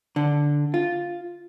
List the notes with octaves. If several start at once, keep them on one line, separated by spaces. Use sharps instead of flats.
D3
F4